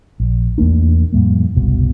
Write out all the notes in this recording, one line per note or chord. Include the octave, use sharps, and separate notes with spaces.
A#1
E2 A3 A#3 D4
F2 A2 G3 A#3
F#1 C2 B2